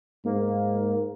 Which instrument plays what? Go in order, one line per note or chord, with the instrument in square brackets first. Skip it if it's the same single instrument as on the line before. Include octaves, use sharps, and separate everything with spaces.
[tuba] G#2 [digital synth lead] A#3